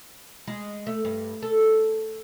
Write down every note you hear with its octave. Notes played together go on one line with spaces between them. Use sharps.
G#3
A3
G2
A4